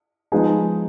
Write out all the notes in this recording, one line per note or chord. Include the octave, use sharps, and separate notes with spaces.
F3 G#3 B3 D#4 G#4